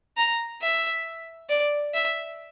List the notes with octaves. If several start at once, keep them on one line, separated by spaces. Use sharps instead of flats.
A#5
E5
D5
E5